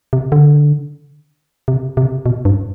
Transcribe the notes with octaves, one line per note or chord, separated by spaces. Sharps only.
C3
D3
C3
C3
B2
G2